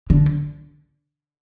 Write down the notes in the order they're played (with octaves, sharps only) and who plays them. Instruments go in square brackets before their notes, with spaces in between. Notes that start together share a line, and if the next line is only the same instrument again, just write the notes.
[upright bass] D3